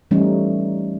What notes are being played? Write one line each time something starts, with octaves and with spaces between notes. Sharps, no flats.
E3 G3 A3 C#4 D#4